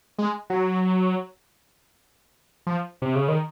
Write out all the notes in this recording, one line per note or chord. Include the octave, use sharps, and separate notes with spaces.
G#3
F#3
F3
C3
C#3
D#3